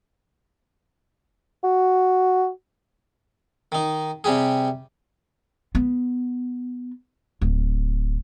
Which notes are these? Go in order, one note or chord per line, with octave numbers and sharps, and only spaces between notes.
F#4
D#3 D#4
C3 G3 G4 G#4
B3
D1